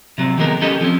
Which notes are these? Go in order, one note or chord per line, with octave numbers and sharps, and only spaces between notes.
C3 F#3 C4
D#3 F#3 G#3 B3 A#4
C#4 G4 A4 D#5
F3 C4 C#4